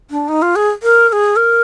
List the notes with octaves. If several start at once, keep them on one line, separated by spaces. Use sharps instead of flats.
D4
D#4
F4
G#4
A#4
A#4
G#4
A#4